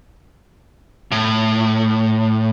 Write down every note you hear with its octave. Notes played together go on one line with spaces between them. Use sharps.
A2